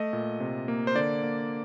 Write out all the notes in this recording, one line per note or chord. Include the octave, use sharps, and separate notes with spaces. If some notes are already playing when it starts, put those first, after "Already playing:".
Already playing: A3 D#5
A#2
C3
A#3
C5
D3 D5
A#3